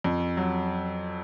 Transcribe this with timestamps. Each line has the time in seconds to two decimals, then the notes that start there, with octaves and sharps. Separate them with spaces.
0.04 F2
0.37 F#3